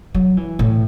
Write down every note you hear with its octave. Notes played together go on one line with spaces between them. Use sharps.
F#3
E3
A2